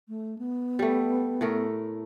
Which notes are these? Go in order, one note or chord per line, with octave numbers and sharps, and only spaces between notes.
A3
B3
G3 A3
A2 A3 A#4